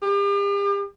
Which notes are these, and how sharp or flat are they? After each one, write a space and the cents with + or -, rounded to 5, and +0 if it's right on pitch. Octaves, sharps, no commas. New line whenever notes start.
G4 +40